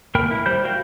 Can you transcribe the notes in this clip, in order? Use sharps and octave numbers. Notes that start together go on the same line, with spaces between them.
A#3 A#4 G5 B5 F6
E4
G3 C5 B5 G6
F#4 A#4 F5 G5